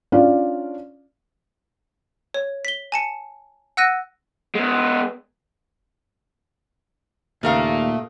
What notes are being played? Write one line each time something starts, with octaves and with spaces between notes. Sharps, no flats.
C#4 D4 F4 D5 F5
C#5
B6 G7
G#5 A5 C#7
F#5 E6 F#6 A#6 D#7
G#3 B3
D#2 A#2 C#3 A3 A#4 F5 A#5